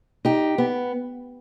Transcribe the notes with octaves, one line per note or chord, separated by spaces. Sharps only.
D#4 G4
B3